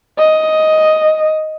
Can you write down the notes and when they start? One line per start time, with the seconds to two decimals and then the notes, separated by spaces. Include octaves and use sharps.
0.18 D#5